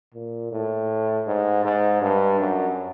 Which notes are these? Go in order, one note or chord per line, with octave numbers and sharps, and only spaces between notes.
A#2
A2
G#2
G#2
G2
F#2